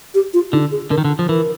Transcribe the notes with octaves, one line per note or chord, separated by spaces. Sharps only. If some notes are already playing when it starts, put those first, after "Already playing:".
G4
F4
D3 D#4
G#4
D3 A#4
D#3
D3
F3
E3 A#4